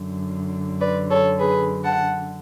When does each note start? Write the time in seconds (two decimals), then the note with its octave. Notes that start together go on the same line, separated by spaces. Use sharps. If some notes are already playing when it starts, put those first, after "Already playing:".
Already playing: F#2 D3
0.81 B4 D5
1.11 A4 C#5
1.39 G#4 B4
1.84 F#5 A5